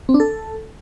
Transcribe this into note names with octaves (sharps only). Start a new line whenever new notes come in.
C4
D4
A4